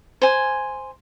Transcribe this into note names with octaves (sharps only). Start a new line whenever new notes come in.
C5 G#5